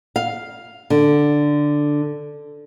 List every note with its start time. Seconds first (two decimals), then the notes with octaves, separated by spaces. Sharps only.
0.16 F5
0.90 D3